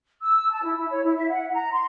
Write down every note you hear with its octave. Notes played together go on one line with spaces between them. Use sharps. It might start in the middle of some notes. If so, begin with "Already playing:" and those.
E6
A5
E4
E4
C#5
E4
E5
F#5
A#5
C6